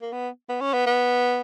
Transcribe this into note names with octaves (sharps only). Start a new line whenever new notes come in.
A#3
B3
B3
C#4
B3
B3